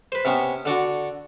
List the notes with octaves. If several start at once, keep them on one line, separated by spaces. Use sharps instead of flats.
B4 C5
C3 B3 C#4
D3 D4 F#4